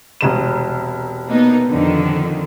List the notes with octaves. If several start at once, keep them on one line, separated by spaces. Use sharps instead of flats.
E1 C2 E7
A#3 B3 D#4
F2 D3 D#3